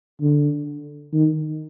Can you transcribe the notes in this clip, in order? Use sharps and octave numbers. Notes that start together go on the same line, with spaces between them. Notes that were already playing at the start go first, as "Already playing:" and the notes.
D3
D#3